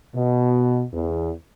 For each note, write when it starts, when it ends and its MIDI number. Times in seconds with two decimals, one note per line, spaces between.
0.14 0.84 47
0.93 1.30 40